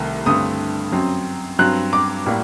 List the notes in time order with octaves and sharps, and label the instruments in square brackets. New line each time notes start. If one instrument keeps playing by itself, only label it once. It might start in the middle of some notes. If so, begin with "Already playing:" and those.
Already playing: [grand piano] C2 C3 D#3 A3 C4
G2 D3 A3 C4 D#6
F#2 F#3 C4
G2 F#3 C4 F#6
D6
A2 G3 A#3